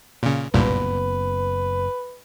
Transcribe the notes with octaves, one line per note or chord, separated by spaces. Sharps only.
A#2 C#3
F#1 C2 G2 A#2 B3 B4